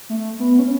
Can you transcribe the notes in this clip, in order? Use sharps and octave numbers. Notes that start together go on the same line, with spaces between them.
A3
B3
C#4